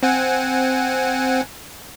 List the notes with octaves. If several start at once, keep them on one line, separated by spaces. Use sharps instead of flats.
C4 F#5 G#5